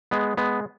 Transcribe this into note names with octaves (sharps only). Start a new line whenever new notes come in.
G#3 B3
G#3 B3